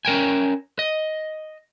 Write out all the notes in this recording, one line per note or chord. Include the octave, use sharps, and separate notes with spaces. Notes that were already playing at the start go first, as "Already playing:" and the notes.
C#4 A#4 G5 G#5
D#5